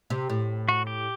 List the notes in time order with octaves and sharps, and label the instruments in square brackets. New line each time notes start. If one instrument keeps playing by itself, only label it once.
[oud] C3
A2
[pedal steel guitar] F#4
G4